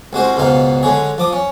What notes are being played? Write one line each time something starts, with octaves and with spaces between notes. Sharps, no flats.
C2 G#3 F#4 C5
C#2 G#2 B2 D#4 F5
D3 G#3 C#4 G#4
F3 D6 D#6
C#4